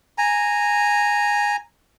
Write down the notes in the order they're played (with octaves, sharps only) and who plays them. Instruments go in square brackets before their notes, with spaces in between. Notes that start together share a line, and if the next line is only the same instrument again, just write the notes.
[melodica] G#5 A#5